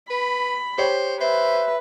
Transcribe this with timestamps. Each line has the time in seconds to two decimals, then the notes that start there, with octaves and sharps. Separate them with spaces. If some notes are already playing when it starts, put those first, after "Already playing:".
0.10 B4 B5
0.78 G4 C5 C#5
1.21 B4 C5 E5